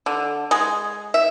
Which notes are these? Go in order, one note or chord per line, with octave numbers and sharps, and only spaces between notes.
D3
G#3
E5